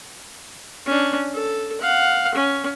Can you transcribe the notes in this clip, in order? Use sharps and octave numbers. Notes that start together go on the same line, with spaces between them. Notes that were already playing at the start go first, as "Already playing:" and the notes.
C#4 D4
A4
F5 F#5
C#4